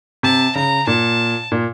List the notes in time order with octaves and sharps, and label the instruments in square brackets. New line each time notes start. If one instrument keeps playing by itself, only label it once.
[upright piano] C3 [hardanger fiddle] A5
[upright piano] C#3 [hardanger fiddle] A#5
[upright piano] A#2 [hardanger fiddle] A5
[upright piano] A#2